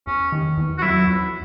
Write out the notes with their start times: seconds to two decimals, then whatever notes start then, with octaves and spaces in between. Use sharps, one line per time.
0.07 E2 C#4
0.32 D#3
0.57 E2
0.78 F#4
0.82 F#3 E4
1.07 E2